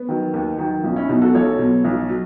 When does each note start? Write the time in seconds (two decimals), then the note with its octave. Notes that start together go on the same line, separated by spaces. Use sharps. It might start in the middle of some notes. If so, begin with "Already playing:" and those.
Already playing: B3
0.08 D#3 F#3
0.34 D#2
0.59 D#3 F#3
0.84 B1 C#4
0.96 C#4 E4
1.09 B2 F#3 D#4 F#4
1.22 F#4 A4
1.34 B1 A4 C#5
1.59 B2 F#3
1.84 B1
2.09 F#3